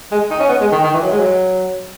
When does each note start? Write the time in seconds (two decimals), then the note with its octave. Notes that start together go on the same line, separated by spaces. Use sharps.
0.12 G#3
0.31 D#4
0.40 C#4
0.49 B3
0.61 G#3
0.72 D#3
0.84 D#3
0.94 E3
1.02 F#3
1.11 G#3
1.20 F#3